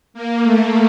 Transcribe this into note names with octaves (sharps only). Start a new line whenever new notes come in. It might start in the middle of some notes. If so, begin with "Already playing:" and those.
A#3
A3